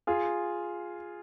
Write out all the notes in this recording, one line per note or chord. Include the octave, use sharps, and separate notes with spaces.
F4 G#4